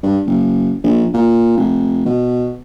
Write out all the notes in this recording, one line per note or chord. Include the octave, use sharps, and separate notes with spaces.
G2
F#1
A#1
A#2
F1
B2